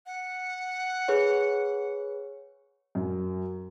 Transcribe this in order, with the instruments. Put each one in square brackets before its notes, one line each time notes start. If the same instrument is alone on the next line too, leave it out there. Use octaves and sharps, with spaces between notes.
[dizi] F#5
[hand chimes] G#4 B4 C#5
[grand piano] F#2